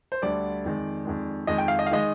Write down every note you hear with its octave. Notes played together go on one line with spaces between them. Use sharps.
C5
D2 D3 G3 D5
F2 D#3 G#3
F2 D#3 G#3
F2 D#3 G#3 D#5
G5
F5
D#5
F5
D#3 G#3 D#5